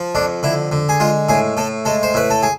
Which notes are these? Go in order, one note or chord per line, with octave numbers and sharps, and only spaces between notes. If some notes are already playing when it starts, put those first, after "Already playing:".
Already playing: F3
F2 D4
D3 E4
D3
G#4
G#3 F4
A2 G#4
A2 A4
G#3 A4
C5
A2 B4
A4
G#4